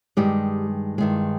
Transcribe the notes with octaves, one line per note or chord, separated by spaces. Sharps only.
G2 D#3 G3 G#3 G4
G2 D#3 G#3